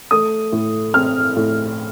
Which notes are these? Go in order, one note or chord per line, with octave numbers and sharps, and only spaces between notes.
A3 D#6
A2
C4 F6
A2